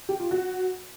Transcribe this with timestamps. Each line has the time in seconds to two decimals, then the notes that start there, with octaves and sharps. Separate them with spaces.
0.09 G4
0.20 F4
0.31 F#4